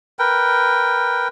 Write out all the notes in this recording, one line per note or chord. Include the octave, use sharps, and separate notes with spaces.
A#4 B4 G5